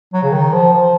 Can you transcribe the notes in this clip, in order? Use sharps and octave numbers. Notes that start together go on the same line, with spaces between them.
F#3
C#3
D#3
F3
F3